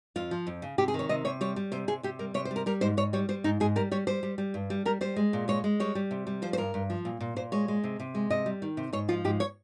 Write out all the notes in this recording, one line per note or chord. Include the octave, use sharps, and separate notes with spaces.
F2 F4
F3
F2
C#3
C3 G4
G#4
D#3 C#5
C3 D#5
C3 C#5
G3 C#5
G3
C3 C5
C3 G#4
C3 G4
G3 A#4
C3 C#5
C5
G3
A#4
G3 A#4
G#2 C5
G#2 C#5
G3 C#5
G3 C5
G#2 D#4
G#2 G#4
G3 A#4
G3 C#5
G3 C5
G3
G3
G2
G3
G3 A#4
G3 C5
G#3
A#2
G#3 C#5
G#3
G3 C#5
G3
C3
G3
F3 C5
C5
G2 A#4
G2
F3
A#2
A#2
A#2 C5
G#3 C#5
G#3
C3
C3
G#3
C3 D#5
G3
D#3
C3
G#2 C#5
F3 F4
G#2 G4
C#5